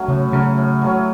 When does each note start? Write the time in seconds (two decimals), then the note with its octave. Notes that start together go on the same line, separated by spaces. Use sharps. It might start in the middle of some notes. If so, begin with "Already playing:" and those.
Already playing: F#3 A3 C#4
0.08 A2 C#3
0.32 C#3 F#3 A3 C#4
0.58 A2
0.82 F#3 A3 C#4